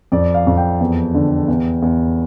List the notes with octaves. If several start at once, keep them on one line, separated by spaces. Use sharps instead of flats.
F2 D5
F5
F2
G5
E2
D3
E2
E2